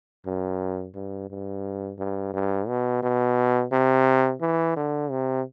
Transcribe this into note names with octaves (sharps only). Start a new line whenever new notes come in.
F#2
G2
G2
G2
G2
B2
B2
C3
E3
D3
C3